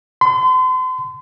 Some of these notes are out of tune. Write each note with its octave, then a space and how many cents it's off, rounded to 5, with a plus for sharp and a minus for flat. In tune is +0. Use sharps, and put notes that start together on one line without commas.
C6 -40